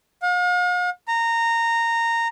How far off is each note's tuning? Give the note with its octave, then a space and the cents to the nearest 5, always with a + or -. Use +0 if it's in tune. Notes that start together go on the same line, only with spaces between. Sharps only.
F5 +45
A#5 -15